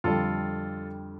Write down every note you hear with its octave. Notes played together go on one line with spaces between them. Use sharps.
F2 D3 G3 F4 A4